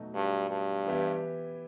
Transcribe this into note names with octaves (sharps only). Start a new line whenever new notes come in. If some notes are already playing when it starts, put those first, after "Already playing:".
Already playing: B2 F#3 A3 D#4 F#4
G2
G2
E3 B3 E4 G4